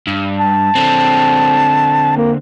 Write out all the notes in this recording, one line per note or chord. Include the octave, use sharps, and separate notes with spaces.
G2
A5
D3 C4
A#3